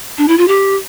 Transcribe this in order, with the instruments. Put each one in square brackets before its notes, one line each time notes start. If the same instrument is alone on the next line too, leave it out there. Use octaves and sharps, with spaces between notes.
[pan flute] D4
E4
F4
G4